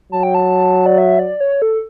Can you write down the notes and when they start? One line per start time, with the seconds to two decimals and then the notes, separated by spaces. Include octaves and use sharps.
0.12 F#3 A5
0.23 G5
0.35 A5
0.86 D5
0.98 E5
1.19 D5
1.40 C#5
1.62 A4